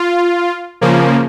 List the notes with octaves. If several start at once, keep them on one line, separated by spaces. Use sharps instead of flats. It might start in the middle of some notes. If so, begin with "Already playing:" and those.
Already playing: F4
C#3 F3 A#3